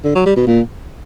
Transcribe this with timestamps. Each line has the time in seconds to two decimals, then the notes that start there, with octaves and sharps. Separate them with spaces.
0.04 D3
0.15 F#3
0.26 G3
0.36 B2
0.47 A#2